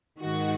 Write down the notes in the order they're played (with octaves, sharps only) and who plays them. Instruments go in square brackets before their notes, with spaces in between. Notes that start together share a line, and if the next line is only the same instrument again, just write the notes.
[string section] G#2 D#3 F#4